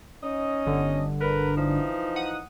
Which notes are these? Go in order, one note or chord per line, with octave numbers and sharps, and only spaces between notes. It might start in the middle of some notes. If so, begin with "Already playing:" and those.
C#4 D#4 D#5
G1 D3
A#4 B4
E3 F3 D#4
F#5 D#6